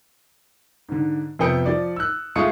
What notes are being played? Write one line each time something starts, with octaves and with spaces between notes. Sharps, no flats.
G#2 D3
F2 C3 B3 G5 D#6 C#7
F3 D5
E6 F#6
G#3 A3 F4 C#6 D#6 C#7